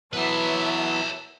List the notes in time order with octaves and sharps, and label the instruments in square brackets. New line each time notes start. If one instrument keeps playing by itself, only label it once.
[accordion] E3 F#3 B3 [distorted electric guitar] B4 C#5 [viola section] E5 A5